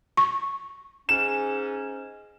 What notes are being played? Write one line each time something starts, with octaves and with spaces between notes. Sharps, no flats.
C#6
G#2 C#4 E7